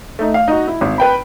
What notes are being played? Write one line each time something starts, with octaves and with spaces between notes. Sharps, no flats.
A3 D#4
F5
D#4 F#4
E4
G#1
B4 G5 B5